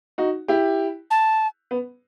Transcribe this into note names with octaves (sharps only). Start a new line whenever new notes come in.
D#4 F#4
E4 G4
A5
B3